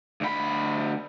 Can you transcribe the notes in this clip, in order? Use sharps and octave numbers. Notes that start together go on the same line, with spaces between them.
D2 B5